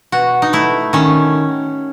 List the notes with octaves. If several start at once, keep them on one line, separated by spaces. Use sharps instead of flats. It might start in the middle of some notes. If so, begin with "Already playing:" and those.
B2 F#4
D#4
A3 E4
D#3 C#4